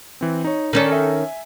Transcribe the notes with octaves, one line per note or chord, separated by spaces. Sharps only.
E3 C4
D#4 C#5
D#3 C#4 A4 D5 A#5
E5 G#5